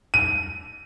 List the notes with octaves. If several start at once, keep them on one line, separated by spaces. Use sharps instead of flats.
D#7